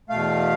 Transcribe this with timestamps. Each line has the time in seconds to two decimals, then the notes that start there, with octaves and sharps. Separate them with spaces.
0.10 E2 B2 A3 F5